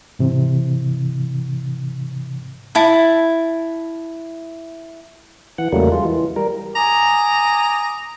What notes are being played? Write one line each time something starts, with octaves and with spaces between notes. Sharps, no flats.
G#2 C3 E3
E4 A5
E3 F#5
E2 C#3 F#3 G3 A3 A#3
G#3 F4
E3
G3 A#4
G#5 A#5 D6 D#6